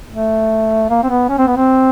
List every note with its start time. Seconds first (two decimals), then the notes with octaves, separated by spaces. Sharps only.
0.11 A3
0.90 A#3
1.03 C4
1.09 B3
1.29 C#4
1.38 C4
1.47 B3
1.56 C4